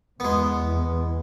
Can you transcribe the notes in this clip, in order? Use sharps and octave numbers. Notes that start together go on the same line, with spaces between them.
E2 G#3 B3